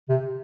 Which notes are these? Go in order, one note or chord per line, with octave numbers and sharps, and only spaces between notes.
C3